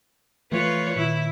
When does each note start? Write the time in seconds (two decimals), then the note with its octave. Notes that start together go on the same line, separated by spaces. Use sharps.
0.52 E3 F3 A3 F4 B4 C#5
0.96 A#2 D#3 E4